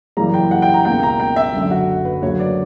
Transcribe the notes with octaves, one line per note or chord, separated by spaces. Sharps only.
F#2 C#3 E3 G3 A#3 A#5
G5
F#5
G5
A#5
C#2 B2 A#3 G5
A#5
G5
E5
F#1 F#2 D3
F#4
B4
D2 C#3 F#3 A#3 C#5
D5